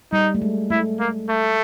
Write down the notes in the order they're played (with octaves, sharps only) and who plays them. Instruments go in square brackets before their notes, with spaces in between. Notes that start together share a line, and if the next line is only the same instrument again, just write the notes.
[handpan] G3 [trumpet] D#4
[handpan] A3
G#3
[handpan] A3 [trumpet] E4
[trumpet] A#3
A3